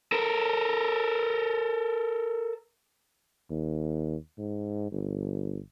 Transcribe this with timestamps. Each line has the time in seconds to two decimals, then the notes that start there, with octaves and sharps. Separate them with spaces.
0.12 A4 A#4
3.50 D#2
4.38 G#2
4.92 G1